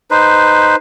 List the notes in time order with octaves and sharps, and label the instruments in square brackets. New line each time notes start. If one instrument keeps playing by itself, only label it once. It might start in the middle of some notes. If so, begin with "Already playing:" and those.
[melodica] D#4 B4 C5